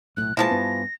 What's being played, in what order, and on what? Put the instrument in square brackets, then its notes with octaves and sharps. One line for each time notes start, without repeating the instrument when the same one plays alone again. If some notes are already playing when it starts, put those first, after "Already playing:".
[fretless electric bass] B1 A2 [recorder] F#6
[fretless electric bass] A#2 G#3 [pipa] E3 F3 A5 [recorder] A#6
[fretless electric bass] G2 B3